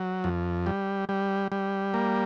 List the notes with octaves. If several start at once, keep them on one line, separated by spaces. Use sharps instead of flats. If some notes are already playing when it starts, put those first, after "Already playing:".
Already playing: F#3
F2
G3
G3
G3
A#3